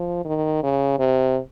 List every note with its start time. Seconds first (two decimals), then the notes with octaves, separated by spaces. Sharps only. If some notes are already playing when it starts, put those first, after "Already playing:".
Already playing: F3
0.25 D#3
0.63 C#3
0.99 C3